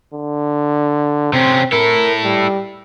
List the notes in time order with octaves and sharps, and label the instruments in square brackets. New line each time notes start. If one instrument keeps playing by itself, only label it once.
[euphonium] D3
[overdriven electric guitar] C3 C#4 [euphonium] C4
[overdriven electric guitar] E4 A4 [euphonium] A#4
[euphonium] G3